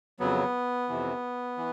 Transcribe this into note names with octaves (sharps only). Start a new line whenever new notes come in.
F2 C#3 F#3 B3
F2 C3 E3
E3